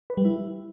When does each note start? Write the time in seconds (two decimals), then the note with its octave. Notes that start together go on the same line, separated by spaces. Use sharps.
0.10 B4
0.17 G3
0.25 E4